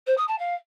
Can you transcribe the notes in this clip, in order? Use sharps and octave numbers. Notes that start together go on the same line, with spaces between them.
C5
D#6
A5
F5